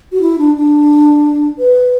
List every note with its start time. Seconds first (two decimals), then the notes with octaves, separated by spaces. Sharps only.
0.12 F#4
0.21 E4
0.39 D4
0.56 D4
1.59 B4